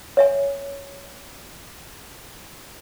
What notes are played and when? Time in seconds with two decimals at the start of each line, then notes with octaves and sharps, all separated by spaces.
0.17 C#5 E5 G#5